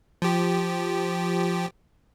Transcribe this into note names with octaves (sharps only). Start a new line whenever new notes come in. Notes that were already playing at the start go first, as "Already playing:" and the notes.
F3 G4